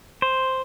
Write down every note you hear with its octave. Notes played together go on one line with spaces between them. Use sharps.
C5